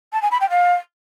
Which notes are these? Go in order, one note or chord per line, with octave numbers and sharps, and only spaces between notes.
A5
G#5
B5
G5
F5